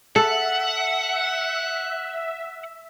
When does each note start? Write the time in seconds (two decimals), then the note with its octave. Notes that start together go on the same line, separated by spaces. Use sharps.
0.16 A4 E5 F#5